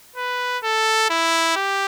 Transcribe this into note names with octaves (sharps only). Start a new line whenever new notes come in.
B4
A4
E4
G4